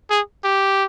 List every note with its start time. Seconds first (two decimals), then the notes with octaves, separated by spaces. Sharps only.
0.10 G#4
0.44 G4